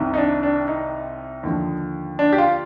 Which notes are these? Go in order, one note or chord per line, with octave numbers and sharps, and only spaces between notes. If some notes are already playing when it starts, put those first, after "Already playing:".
Already playing: C2 C3 D#3
D#4
D4
D4
D#4
D#2 D3 F3
D4
G4
F4